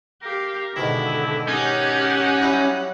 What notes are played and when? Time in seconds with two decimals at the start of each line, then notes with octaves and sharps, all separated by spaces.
0.23 G4 A#4 F5
0.76 G#2 B2 D3 D#3 E4
1.49 C#4 D#4 G4 F#5
2.42 F#3 G3 E4